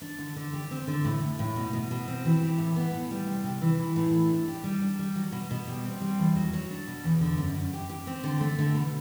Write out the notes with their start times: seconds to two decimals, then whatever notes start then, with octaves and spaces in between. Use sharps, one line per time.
0.02 D4
0.19 D3
0.36 D3
0.53 G4
0.71 C4
0.87 D3
1.05 A2
1.21 A2
1.39 A2
1.56 B2
1.73 B2
1.91 B2
2.08 C4
2.25 E3
2.42 G4
2.58 A2
2.76 B3
2.92 A2
3.11 G3
3.27 C3
3.44 C3
3.61 E3
3.78 E3
3.96 A2
4.14 A3
4.30 D4
4.48 G4
4.64 G3
4.82 D4
4.99 G3
5.16 F#3
5.32 B2
5.51 B2
5.68 G3
5.85 C4
6.01 G3
6.18 E2
6.36 F#3
6.53 F#3
6.71 D4
6.87 B2
7.04 E2
7.21 D3
7.38 F#2
7.55 F#2
7.73 G4
7.89 G4
8.07 C4
8.24 D3
8.41 A3
8.58 D3
8.75 B2